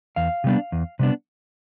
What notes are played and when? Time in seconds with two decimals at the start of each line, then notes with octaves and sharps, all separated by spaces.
0.16 E2 F5
0.44 C3 G3 B3 D4
0.72 E2
0.99 C3 G3 B3 D4